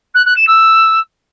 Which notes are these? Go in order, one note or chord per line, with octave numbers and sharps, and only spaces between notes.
F#6
F#6
E7
E6